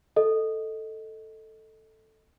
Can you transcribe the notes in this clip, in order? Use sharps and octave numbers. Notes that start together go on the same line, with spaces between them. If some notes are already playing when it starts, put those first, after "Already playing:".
A4 D#5